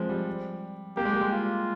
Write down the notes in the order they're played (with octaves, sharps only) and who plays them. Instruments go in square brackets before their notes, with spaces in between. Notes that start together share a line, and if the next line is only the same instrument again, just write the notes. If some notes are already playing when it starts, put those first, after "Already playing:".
Already playing: [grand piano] F3 G#3 C4
G3
[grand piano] A#3 [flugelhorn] G4
[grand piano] G#3
G3
G#3
[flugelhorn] F4